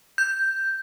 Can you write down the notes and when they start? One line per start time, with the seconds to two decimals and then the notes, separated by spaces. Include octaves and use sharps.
0.18 G6